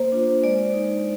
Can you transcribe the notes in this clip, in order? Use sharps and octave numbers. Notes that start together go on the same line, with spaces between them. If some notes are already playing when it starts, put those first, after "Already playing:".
Already playing: A#3 C5
D4 F4
G#3 D5
D#4